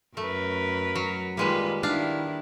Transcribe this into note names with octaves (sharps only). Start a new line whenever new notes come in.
F#2 A3 A#4 B4
F#3
D#3 G3 G#3 A#3 F4 B4
D#3 D4 E4 F5